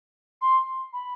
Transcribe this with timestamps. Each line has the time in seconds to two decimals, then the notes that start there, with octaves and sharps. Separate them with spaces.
0.41 C6
0.93 B5